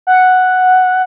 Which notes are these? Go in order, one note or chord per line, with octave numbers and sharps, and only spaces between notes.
F#5